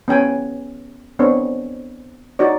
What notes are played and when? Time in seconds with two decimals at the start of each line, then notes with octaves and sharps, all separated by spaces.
0.08 B3 C#4 G5 G#5
1.19 B3 C4 D4 C#5
2.39 D#4 F#4 C#5 D5